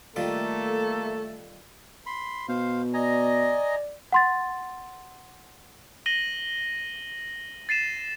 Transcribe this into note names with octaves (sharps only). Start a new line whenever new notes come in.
D#3 G3 A3 A#3 F4 A4
B5 C6
B2 C5 F5
D5 D#5 G#5 A#5
F#5 C6 A6
A#6 D#7 F#7 G7
A6 C7 D#7 E7